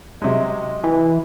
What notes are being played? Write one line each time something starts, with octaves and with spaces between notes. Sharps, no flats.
C3 F#3 G#3 D#5
E3 B4